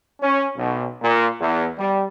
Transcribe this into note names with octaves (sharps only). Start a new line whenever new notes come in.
C#4
B1
A#2
E2
G3